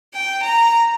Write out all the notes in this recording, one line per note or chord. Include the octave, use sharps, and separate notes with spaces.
G5
A#5